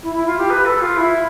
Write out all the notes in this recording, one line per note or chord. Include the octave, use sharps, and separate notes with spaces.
E4
E4
F4
G4
B4
A4
F4
E4